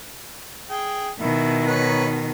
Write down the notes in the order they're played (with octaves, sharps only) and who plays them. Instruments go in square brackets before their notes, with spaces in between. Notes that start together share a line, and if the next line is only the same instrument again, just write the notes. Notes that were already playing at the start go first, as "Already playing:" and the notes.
[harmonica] G#4 G5
[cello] B2 D#3 [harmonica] E4
[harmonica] D#4 B4 C#5